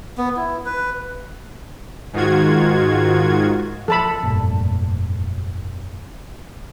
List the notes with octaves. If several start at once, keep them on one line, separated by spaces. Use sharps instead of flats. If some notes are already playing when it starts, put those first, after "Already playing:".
B3
E4
B4
G#2 D#3 F4 F#4 G#6
F3 A4 A5 B5
F1 G2 A#2